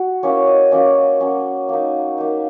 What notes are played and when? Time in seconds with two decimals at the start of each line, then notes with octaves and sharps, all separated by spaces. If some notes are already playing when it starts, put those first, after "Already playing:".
Already playing: F#4
0.23 A#3 C#4 E4 C#5
0.47 D#5
0.71 F#3 A#3 C#4 D#5
1.20 F#3 A#3 C#4
1.69 A#3 D#4
2.18 A#3 D#4 E5